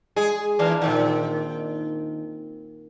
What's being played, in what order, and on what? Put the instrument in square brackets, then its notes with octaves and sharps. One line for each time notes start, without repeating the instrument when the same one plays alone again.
[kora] G#3 [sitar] G#4
[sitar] A#2 E3 [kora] D4 F5
[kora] A#2 C4 F#5 [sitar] D#3